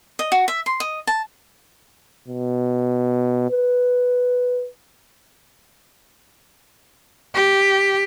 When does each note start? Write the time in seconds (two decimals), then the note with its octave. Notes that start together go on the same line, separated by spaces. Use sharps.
0.19 D#5
0.32 F#4
0.48 E5
0.66 C6
0.80 D#5
1.07 A5
2.28 B2
3.51 B4
7.35 G4